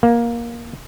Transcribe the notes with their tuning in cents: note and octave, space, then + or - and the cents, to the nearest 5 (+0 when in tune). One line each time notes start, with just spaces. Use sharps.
A#3 +15